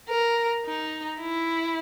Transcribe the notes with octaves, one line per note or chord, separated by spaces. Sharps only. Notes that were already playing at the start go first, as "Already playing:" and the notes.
A#4
D#4
E4